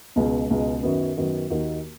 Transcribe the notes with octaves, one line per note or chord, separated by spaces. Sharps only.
C#2 B2 G#3
C#2 B2 G#3
F#2 D#3 F#3 B3
F#2 D#3 F#3 B3
D#2 D#3 A#3 D#4 F#4